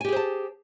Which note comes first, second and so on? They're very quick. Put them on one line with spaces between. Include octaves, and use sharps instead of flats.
G#5 G4 G#4 C5 A5